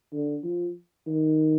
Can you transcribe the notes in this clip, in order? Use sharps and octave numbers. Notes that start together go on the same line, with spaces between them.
D3
F3
D#3